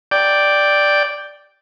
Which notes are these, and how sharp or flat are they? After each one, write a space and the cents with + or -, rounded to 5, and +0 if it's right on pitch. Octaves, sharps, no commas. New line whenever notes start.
D5 +0 G5 +0